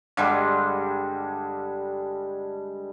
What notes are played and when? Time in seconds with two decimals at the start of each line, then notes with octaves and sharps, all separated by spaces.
0.17 G2 D3 G3 G#3